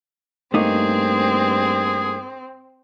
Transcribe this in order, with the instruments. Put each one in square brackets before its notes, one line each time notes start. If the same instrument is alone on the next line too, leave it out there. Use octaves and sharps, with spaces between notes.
[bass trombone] G2 [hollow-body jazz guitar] A3 A#3 D#4 [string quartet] C4 [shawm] G#4